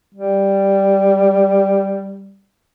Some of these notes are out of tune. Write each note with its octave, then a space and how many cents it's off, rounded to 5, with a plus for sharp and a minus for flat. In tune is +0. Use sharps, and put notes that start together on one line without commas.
G3 +0